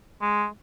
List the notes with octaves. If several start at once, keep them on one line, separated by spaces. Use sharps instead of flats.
G#3